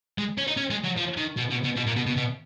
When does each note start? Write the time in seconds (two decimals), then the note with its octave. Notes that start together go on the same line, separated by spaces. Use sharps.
0.18 G#3
0.38 C#4
0.47 D#4
0.57 C#4
0.71 G#3
0.84 F#3
0.97 F3
1.17 D#3
1.37 B2
1.50 B2
1.64 B2
1.76 B2
1.87 A#2
1.96 B2
2.06 B2
2.16 B2